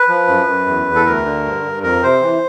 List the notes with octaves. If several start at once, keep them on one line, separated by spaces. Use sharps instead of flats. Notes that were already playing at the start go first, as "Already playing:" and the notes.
Already playing: B4
F3
F#2
F#2
E2
E2
A4
D2 A#4
D3
G2
G2
F2 A#4
C3 C5
E3